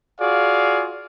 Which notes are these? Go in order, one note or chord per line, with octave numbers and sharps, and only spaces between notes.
F4 F#4 G#4 D5 F5